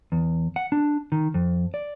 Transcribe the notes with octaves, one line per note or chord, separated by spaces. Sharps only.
E2
F#5
D4
D#3
F2
D5